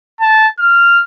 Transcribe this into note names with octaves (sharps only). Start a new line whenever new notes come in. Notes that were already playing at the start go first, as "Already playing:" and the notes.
A5
F6